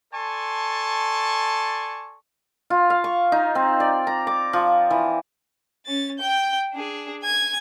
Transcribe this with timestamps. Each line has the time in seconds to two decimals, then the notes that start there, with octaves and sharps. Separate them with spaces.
0.14 A4 D5 G#5 A5 C6 C#6
2.70 F4
2.90 F5
3.04 C#6
3.32 D#4
3.55 C4
3.80 D5
4.07 A#5
4.27 D6
4.53 F3
4.90 E3
5.85 C#4 A6
6.19 G5 G6
6.73 D4 G#4
7.23 G#5 G#6